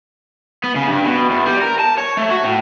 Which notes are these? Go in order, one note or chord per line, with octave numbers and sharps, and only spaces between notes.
B3
C#3
G2
B2
E2
G3
A#4
A5
C#5
A3
F#4
A2